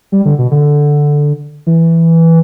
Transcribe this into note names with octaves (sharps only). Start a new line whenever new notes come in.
G3
D3
B2
D3
E3